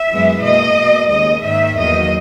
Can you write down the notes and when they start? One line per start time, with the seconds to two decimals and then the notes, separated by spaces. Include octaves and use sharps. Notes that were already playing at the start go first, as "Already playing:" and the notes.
Already playing: E5
0.09 F#2 E3 G#3 B3
0.43 B2 A#3 D#5
0.76 B2 A#3
1.10 D#2 C#3 G#3 D#5
1.44 G#2 D#3 A#3 E5
1.77 E2 D#3 F#3 A#3 D#5